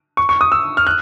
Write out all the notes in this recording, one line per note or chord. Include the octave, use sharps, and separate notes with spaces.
C#6
C#6
D#6
E6
F6
F#6